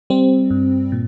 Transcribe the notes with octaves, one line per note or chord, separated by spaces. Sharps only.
G3 C4
G2
A#2